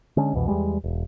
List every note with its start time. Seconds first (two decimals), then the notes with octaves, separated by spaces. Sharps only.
0.17 D3 G#3 C#4
0.34 C2 F2 B2 E3
0.48 E2 E3 G3 G#3
0.84 E1